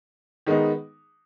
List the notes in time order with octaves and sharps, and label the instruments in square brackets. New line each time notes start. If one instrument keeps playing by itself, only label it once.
[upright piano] D#3 G#3 B3 D#4